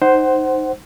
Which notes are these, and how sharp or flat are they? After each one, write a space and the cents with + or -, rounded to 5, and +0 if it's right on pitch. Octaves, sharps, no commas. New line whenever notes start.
D#4 +0 C5 +0 F#5 +25